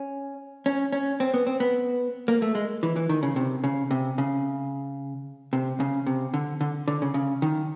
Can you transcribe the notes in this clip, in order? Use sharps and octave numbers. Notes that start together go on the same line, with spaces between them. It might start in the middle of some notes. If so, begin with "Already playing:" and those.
Already playing: C#4
C#4
C#4
C4
B3
C4
B3
A#3
A3
G#3
E3
E3
D#3
C#3
C3
C#3
C3
C#3
C3
C#3
C3
D3
D3
D3
C#3
C#3
D#3